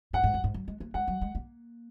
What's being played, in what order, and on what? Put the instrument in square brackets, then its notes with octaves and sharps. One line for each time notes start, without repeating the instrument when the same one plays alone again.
[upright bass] G#2 [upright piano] F#5
[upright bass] G#2
F#2
G#2
F#3
G#3
A#3
[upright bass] G#3 [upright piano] F#5
[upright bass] F#3
G#3
A#3